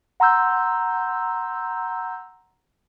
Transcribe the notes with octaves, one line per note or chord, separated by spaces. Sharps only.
F#5 A#5 C6 E6 G6